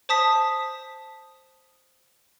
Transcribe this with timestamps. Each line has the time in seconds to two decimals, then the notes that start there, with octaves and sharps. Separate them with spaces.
0.09 C5 A5 D#6 B6